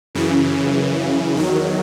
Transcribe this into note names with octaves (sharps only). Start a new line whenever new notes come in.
F#2 C#3 E3
E2 D#3 F#3